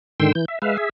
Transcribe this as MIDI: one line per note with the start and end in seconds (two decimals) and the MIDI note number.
0.20 0.32 44
0.20 0.32 50
0.20 0.32 51
0.20 0.32 79
0.20 0.32 84
0.20 0.32 88
0.35 0.45 52
0.35 0.45 91
0.48 0.59 76
0.62 0.77 56
0.62 0.77 71
0.62 0.77 76
0.62 0.77 77
0.78 0.89 68
0.78 0.89 76